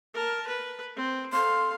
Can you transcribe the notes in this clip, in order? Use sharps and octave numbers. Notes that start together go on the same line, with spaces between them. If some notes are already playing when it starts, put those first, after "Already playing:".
A#4 A5
B4
C4
A4 F5 C6